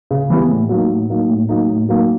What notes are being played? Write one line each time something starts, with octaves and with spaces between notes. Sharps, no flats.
C#3
E3 G3 B3
A2
F#3 A#3 D#4
A2
F#3 A#3 D#4
A2
F#3 A#3 D#4
A2
F#3 A#3 D#4